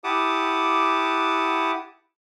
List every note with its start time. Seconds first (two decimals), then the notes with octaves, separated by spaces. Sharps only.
0.04 E4 G4 F#5 A5 D6 D#6